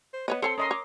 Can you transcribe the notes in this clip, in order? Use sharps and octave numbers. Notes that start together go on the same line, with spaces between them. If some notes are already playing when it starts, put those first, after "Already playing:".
C5
B3 B4 C#5 D#5
C4 A4 C#5 A5 C6 C#7
C#4 A#4 D#5 C6 D#6
C#5 D6